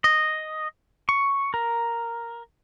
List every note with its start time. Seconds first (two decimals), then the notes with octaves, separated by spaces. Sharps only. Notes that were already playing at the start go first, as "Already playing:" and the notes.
0.04 D#5
1.09 C#6
1.54 A#4